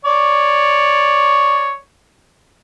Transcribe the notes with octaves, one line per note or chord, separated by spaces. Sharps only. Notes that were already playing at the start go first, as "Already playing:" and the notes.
C#5 D5